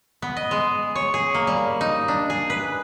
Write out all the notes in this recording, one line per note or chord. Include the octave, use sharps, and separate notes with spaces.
B3
D#5
G#3
C#5
G#4
A#3
G3
D#4
D4
G#4
B4